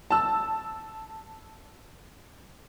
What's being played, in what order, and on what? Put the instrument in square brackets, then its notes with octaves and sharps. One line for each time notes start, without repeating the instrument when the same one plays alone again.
[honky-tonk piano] A5 E6